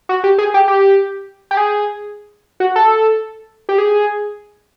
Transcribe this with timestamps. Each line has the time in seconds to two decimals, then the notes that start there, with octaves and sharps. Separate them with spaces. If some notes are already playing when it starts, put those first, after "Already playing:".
0.09 F#4
0.24 G4
0.38 G#4
0.54 G4
0.68 G4
1.51 G4
1.57 G#4
2.60 F#4
2.76 A4
3.69 G4
3.78 G#4